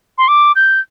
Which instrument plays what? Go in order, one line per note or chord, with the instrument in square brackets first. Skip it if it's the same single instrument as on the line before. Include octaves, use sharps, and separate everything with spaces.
[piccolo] C6
D6
G6